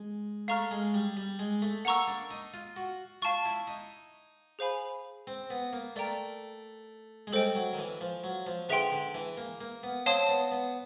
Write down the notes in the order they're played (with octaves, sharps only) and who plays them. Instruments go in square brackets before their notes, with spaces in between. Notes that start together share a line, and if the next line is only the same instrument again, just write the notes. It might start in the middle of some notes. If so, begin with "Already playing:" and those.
Already playing: [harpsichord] G#3
[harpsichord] A3 [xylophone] F5 A#5 C#6 F6
[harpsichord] G#3
G3
G3
G#3
A3
[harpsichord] A#3 [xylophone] F#5 A#5 C#6 E6
[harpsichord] D4
D#4
F4
F#4
[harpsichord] F4 [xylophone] F5 A5 C#6
[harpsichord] E4
D#4
[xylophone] G#4 C5 F5 G#5 B5
[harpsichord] C4
B3
A#3
[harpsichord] A3 [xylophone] A#4 D5 G5 A#5
[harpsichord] G#3
[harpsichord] G3 [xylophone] A4 C5 D#5 G5
[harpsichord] F#3
D#3
E3
F3
F#3
F3
[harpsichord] D3 [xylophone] G#4 B4 E5 G5 C6
[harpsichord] D3
E3
A#3
A#3
B3
[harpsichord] C4 [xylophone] C#5 F5 A5 C6 D#6
[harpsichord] B3
B3